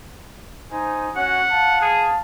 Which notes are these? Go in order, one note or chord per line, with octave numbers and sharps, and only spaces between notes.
D#4 C5 G#5
C#4 F#4 F#5
F5 A5
G#4